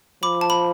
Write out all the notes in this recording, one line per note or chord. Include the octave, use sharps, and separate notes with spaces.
F3 B5 D6
A5
B5